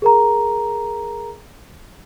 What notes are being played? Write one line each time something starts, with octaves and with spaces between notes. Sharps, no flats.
G#4 A#4 A#5